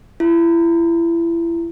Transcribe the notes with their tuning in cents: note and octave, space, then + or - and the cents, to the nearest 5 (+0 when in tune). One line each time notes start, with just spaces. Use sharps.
E4 +30